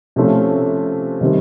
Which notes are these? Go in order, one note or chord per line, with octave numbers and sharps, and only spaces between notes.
C3 F3 A3 C#4 F4
C3 D#3 G3 C4